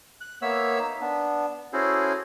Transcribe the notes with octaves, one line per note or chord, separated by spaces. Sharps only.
F#6
A#3 B3 C#5 E5 E6
D#4
B3 D4
C#4 E4 F#4 G#4 A4 C5